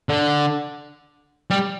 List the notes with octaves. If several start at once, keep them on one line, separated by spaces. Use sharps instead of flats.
D3
G3